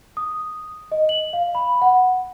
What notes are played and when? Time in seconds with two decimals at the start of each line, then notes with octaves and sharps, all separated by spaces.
0.17 D#6
0.92 D#5
1.09 F#7
1.33 F5
1.55 B5
1.82 F#5